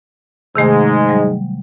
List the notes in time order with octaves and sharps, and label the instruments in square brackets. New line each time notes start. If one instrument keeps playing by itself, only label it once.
[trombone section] G#2 G#3 [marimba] C3 D#3 A3
[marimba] F#3 G3